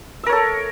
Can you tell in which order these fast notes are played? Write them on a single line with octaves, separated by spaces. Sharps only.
E5 A#4 C#5 A4